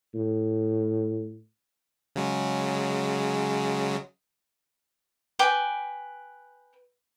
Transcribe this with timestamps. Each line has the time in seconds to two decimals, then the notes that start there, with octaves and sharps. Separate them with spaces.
0.14 A2
2.16 C#3 F#3 G#3
5.39 B4 G5 G#5 D6